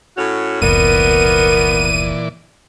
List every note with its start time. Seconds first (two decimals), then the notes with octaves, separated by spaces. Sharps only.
0.17 A2 C#4 F#4
0.62 F1 C#2 A#2 E3 B3 A#4 D5 D#7